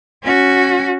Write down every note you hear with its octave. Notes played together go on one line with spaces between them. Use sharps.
C#4 F#4